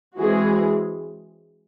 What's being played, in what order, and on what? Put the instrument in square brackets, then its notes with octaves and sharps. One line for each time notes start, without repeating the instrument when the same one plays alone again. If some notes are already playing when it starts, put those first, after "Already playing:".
[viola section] E3 G#3 C4 F#4 G#4